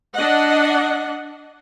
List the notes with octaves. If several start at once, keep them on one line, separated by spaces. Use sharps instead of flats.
D4 D#5 F#5